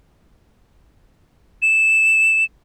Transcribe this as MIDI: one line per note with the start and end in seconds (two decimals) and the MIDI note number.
1.62 2.44 100